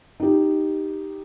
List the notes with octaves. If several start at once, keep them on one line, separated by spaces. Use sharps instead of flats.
D#4 G4